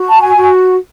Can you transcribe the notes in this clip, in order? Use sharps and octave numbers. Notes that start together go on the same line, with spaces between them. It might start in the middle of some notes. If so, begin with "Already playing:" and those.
Already playing: F#4
A5
G#5
F#4